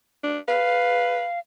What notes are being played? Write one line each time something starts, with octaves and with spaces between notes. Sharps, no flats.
D4
B4 F5